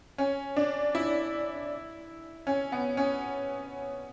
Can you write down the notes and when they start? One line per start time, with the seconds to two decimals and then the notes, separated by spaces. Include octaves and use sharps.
0.18 C#4
0.57 D4
0.95 E4
2.47 C#4
2.72 B3
2.97 C#4